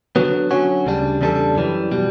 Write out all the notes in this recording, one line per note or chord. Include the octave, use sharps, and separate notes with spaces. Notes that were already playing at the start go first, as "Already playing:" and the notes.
D3 F#3 B3
D3 F#3 C#4 F#4
D2 C#3 G3 D4
E2 C#3 G3 D4 A4
F#2 E3 G3
B2 G3